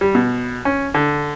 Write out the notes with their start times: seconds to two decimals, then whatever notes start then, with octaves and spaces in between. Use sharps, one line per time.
0.01 G3
0.15 B2
0.65 C#4
0.94 D3